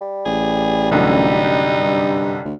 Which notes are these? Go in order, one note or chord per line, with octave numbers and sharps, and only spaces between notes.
G3
A1 G#4
C2 F#2 D3 D#4
G2
D2